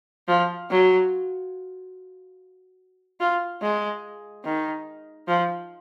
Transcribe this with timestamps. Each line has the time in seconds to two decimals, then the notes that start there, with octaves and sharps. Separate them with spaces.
0.28 F3
0.71 F#3
3.20 F4
3.62 G#3
4.44 D#3
5.28 F3